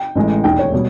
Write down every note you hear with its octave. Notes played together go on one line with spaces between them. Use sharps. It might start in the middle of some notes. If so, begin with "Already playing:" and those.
Already playing: G5
A1 A2 E3 G#3
E1 D#2 D#3 G5
C#5
B2 G3